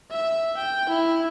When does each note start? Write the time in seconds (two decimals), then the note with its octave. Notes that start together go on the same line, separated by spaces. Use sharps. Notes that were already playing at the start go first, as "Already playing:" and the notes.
0.11 E5
0.57 G5
0.89 E4